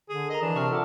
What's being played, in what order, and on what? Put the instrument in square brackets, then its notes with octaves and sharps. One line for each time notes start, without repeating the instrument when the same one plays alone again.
[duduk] D3 [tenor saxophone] G#4
[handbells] A#4 A#5 [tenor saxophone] D#5
[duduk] E3 [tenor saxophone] D4
[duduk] C3 [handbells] A5 C#6 F6
[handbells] F4 F#5 D6 [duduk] A4